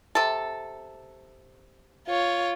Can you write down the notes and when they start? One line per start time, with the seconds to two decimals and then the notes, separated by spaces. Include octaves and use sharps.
0.15 C3 A4
2.07 F4 C#5